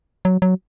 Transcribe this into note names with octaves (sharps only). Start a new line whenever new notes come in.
F#3
F#3